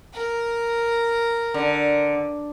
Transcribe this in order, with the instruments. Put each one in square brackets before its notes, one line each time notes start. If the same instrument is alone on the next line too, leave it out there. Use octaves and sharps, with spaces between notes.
[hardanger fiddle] A#4
[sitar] D3